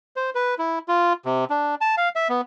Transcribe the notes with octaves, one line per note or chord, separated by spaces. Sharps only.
C5
B4
E4
F4
C3
D4
A5
F5
E5
B3